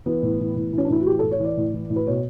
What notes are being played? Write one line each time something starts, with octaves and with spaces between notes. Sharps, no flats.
E3 B3
A2
E3
A2
E3
C#4
D4
A2 E4
F#4
E3 G4
A4
A2
C#5
E3 D5
A2
E3
A2
B4
B2 C#5